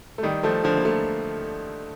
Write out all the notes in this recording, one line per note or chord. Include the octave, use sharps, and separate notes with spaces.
A3
D#3 G3
F3 A3
D3 F3
A#3
F3 A3